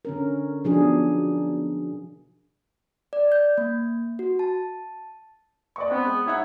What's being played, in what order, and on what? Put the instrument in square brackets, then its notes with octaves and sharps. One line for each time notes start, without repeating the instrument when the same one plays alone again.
[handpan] D3 C#4 A#4
B2 F3 D4 D#4 G#4
[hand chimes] D5
G6
A#3
F#4
A5
[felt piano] D5 D#5 C#6
[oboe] B3 [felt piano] C4 F#5
[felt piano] G#3
[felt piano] D#4 E5 F#5 [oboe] C#5